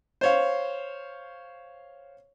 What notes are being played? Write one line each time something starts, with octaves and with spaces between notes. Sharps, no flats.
C5 C#5 F5